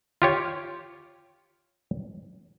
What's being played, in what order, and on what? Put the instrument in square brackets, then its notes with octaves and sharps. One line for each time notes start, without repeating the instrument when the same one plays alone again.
[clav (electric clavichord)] F4 G4 C#5